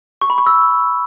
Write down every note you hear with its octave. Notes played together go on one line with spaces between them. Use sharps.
C#6
B5
C#6
E6